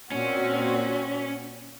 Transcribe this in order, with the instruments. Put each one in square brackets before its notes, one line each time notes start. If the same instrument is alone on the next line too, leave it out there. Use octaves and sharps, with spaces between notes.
[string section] A#2 C4 F#4 [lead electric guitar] C#4